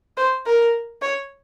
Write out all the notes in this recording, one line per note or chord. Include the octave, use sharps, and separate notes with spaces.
C5
A#4
C#5